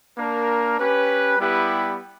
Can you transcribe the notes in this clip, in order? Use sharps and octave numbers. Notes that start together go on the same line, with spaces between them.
A#3 D4 A#4
C#4 G4 B4
G3 B3 E4 G4 B4